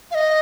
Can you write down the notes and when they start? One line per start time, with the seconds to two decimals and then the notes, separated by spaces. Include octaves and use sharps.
0.11 F5
0.15 D#5